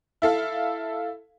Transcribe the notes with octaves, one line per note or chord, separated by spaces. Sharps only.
E4 A4 F5